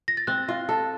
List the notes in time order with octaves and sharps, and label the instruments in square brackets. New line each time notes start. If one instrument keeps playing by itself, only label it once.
[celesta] A#6
A6
[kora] C4 [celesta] F#6
[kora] F4
A4